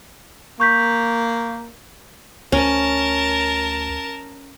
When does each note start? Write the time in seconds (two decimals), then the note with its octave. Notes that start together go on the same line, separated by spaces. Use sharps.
0.60 A#3 C#6 G6 B6
2.52 D2 C#4 A#4 A5